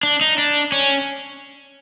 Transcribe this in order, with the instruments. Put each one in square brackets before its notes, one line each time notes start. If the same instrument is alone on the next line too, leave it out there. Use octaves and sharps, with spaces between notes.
[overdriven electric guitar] D4
D#4
D4
C#4